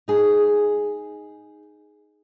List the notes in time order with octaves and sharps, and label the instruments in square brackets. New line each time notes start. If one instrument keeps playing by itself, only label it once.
[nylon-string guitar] D#4 G#4